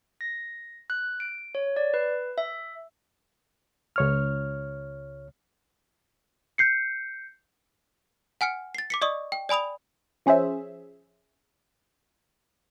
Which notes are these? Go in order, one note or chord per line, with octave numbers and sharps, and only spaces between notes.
A#6
F#6
D7
C#5
D5
B4
E5
C#2 C#5 F6
G6 C7 C#7
F#5 G#5 F6 C#7
A6 C7
D6 B6 C#7
D5 D#5 C#6 D#6
G5
D5 G#5 B5 D#6 F7
F3 C#4 G#4 C5 E5